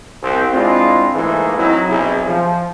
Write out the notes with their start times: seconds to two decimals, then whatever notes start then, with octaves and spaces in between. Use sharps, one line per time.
0.23 C2 C4
0.54 G#3 C4 D4 E4 F4
1.15 G#2 E3 A3 A#3 G#4
1.58 F#3 C4 D#4 E4
1.89 B1 C3 E4 G#4
2.26 F3